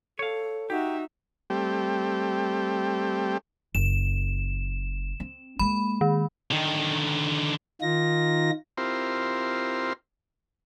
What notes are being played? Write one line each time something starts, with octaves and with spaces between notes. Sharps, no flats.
A4 C#5 F5
D#4 F#4 G4 E5
G3 A3 C4 G4
F#1 E7
C4
G#3 A#3 B5
D#3
D3 D#3
D#3 D#4 F4 A#6
C4 E4 F4 G4 A#4 C5